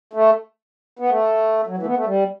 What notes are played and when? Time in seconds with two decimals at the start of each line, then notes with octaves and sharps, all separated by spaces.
0.13 A3
0.99 B3
1.10 A3
1.67 F#3
1.77 E3
1.83 A3
1.87 B3
1.97 A3
2.06 G3